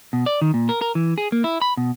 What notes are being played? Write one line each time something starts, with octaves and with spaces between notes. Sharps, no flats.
B2
D5
D#3
A#2
A#4
A#4
E3
G#4
A#3
E4
B5
B2